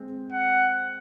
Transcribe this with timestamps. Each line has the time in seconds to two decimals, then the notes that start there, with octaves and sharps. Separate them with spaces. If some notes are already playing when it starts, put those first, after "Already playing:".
Already playing: G#3 C4
0.33 F#5